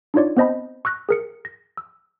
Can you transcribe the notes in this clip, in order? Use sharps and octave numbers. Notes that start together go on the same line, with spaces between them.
D4 D#4 F4 C#5 D5
B3 C4 C5 D#5 A5 B5
C#6 E6 F#6 A#6
G#4 A#4 C#7
A#6
E6